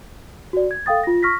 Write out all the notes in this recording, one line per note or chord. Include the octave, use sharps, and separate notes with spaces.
F#4 D5
G#6
A4 F5 G5 D#6 A6
F4 A#6
C#6 F6 A#6 B6